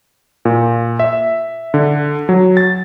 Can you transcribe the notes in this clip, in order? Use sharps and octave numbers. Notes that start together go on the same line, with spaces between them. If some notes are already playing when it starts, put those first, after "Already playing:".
A#2
E5
D3
F#3
A6